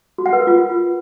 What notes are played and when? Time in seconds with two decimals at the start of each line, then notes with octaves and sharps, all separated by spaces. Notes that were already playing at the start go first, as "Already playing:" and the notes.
0.18 F#4
0.26 F#5
0.33 B4
0.40 A#4
0.47 F4